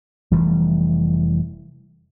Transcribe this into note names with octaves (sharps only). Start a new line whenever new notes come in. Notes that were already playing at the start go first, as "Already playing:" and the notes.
F1 E3 G3 A3